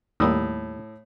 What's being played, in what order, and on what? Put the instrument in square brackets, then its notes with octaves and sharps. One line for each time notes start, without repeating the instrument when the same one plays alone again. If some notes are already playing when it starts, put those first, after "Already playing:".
[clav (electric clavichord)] D#2 G3 A#3 [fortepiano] A2 D#6 E6